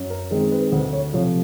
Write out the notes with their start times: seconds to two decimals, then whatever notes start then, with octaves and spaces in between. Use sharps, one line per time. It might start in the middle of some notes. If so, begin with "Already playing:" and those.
Already playing: F#2
0.10 A#4
0.31 D#3 G#3 C4 A#4
0.52 B4
0.72 D2 C5
0.93 C#5
1.13 C3 F3 A3 C4 C#5